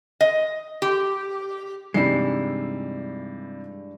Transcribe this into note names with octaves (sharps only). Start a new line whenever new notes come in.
D#5
G4
G2 C3 E3 G3 G#3 D#4 E4 C7